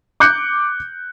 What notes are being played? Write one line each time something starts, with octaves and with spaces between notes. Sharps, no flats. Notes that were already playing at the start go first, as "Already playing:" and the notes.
D6 F#6 G6 C#7